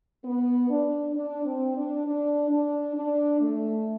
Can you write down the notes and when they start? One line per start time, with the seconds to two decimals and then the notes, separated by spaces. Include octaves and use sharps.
0.24 B3
0.70 D4
1.15 D4
1.46 C4
1.76 D4
2.06 D4
2.50 D4
2.96 D4
3.41 A3